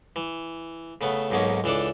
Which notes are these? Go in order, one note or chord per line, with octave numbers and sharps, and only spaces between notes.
E3
C#3 A3 B3
B1 G#2 B2 A#3 C#4
C#2 E3 D4 A4 D5